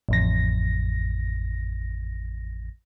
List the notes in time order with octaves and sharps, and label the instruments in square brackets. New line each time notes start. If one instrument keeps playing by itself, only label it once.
[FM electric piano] A1 F2 A#6